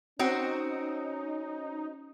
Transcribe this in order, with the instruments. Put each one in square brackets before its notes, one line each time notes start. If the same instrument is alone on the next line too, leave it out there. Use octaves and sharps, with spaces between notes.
[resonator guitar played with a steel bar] C4 F#4 [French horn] C#4 [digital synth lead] D#4 [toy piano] C5 C#5